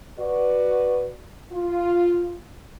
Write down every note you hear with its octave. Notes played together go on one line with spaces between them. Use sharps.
F#4 B4 D5
F4